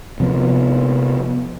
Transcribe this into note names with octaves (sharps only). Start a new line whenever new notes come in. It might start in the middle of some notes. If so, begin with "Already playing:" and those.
C3 F3 B3